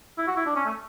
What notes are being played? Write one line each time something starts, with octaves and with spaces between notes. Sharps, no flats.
E4
F#4
E4
D4
C#4
A3